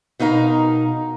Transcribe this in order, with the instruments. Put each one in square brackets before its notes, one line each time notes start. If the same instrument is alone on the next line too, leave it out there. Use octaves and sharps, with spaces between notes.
[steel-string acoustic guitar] B2 D#4 A#4 F5 A#5